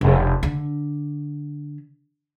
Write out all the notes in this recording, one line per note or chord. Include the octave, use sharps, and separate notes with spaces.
F1
D3